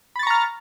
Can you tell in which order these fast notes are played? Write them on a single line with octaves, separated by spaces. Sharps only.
B5 A6 C#6 A#5 F6